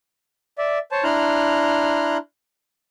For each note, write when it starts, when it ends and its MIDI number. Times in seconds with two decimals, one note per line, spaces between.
0.58 0.79 74
0.58 0.79 76
0.92 1.04 72
0.92 1.04 73
0.92 1.04 81
1.04 2.17 62
1.04 2.17 64
1.04 2.17 82
1.04 2.17 84
1.04 2.17 89
1.04 2.17 90